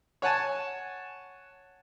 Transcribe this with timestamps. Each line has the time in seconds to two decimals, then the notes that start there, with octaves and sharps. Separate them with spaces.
0.22 C#5 F#5 G#5 A5